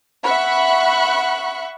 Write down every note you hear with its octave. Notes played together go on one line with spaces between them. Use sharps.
E5 F#5 B5 C#6 F#6